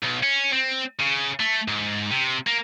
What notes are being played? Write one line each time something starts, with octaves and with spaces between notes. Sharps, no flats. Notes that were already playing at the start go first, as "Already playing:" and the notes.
B1
C#4
C4
C#3
A3
G#2
C3
A#3